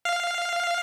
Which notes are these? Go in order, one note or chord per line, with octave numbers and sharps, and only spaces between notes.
F5